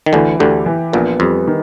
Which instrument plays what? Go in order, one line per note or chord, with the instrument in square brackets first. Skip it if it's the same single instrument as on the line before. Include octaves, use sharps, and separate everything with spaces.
[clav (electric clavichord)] D#3
[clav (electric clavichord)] D2 D3 [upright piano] E3
[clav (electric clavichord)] D2 D3 [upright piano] G4
[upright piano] E3
[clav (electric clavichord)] A#1 A#2 [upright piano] B3
[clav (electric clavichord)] F2 [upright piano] G3
[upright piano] D#3